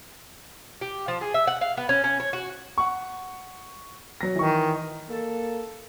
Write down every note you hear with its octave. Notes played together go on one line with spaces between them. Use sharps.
G4
F3
G#4
E5
F#5
F5
B3
C#4
C#4
C#5
F#4
F#5 C#6
F#3 A#6
D#3 E3 C#6
A#3 A4